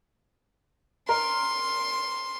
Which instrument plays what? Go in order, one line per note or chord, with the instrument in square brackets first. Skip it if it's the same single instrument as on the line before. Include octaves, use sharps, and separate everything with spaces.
[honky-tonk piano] A#4 [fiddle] C6